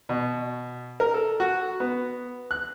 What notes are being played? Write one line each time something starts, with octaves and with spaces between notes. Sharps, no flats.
B2
A#4
A4
F#4
B3
F#6